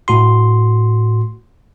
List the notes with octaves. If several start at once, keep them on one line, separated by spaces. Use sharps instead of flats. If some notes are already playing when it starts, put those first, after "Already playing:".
A2 F#4 C6